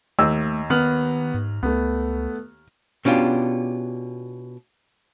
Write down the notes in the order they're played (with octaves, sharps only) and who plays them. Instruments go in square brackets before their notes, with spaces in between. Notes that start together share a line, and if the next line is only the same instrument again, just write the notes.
[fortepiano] D#2 E6 [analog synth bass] A3
[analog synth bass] D#3 [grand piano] B3 F6 F#7
[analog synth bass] G#2
[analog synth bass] C#2 [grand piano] A3 B3
[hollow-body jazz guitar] B2 C#4 D4 F4 G4